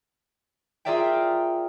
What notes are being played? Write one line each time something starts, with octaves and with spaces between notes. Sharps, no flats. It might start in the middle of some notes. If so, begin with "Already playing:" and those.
F4 G#4 A#4 D5 E5 G5